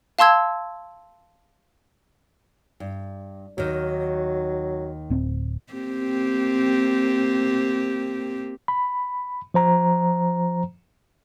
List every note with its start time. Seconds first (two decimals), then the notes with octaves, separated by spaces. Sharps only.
0.19 F5 A5 C6 E6 G#6
2.80 G2
3.58 D#2 D#3 F#3
5.10 D1 C4
5.73 A#3 C4 G4
8.68 B5
9.54 F3 C5 A#5